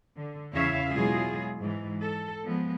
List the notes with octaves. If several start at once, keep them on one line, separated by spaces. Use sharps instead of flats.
D3
E2 C#3 E4 C#5 E5 F5
B2 F#3 G#3 E4 F4 G#4
G#2 E3
A4
F3 G#3 B3